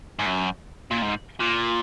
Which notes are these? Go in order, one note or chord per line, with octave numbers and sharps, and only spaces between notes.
G#2
F#2
A#2
G#2
A#2